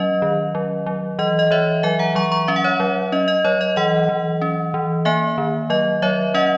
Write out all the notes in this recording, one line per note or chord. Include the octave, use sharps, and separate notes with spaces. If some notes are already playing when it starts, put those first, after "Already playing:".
Already playing: F#3 C#4 D#5
D#3
F#3
F#3
E3 D#5
D#5
E3 C#5 E5
F#3 E5 G#5
F#5 A#5
F#3 A#5 C#6
A#5 C#6
C#4 E5
F#5
C#5 E5
F#3
C#4 D#5
D#5
F#3 C#5
D#5
E3 D#5 F#5
E3
C#4
E3
A#3 E5 G#5
D#3
F#3 D#5
F#3 C#5 E5
C#4 D#5 F#5